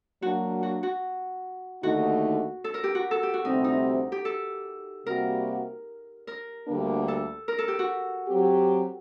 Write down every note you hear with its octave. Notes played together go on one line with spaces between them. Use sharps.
F#3 A#3 D4 F#4
F#4
F#4
D#2 D3 A3 D#4 F#4
A4
A#4
G4
F#4
A4
G4
F#4
D2 C3 G3 C4 D#4
D#4
G4
A4
C3 G3 A#3 F#4 A#4
A#4
D2 D3 G3 A#3 D4
A4
A#4
A4
G4
F#4
F#3 C4 G4